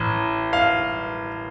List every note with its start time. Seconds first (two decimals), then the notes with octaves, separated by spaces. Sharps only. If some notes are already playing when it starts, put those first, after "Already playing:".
Already playing: A1
0.53 F5